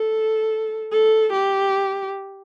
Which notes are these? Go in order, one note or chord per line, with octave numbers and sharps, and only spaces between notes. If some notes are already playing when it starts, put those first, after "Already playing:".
Already playing: A4
A4
G4